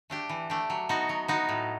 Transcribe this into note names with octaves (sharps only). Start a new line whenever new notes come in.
A3 D4 G4
E3
A3 D4 G4
F#3
B3 D#4 F#4
F#3
B3 D#4 F#4
A2